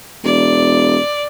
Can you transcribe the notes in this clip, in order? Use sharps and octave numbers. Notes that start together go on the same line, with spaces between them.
E1 D5